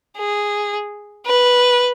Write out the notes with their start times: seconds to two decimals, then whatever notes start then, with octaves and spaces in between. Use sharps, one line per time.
0.18 G#4
1.26 B4